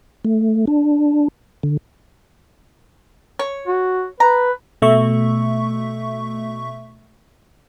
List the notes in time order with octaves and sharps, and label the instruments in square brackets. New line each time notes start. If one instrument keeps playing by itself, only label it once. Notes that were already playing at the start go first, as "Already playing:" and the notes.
[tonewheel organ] A3
D4
D3
[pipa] C#5
[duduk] F#4
[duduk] B4 [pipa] A#5
[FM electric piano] B2 A3 E5 C#6